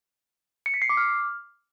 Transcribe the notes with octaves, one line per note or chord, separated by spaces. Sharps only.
C#7
B6
C7
D6
F6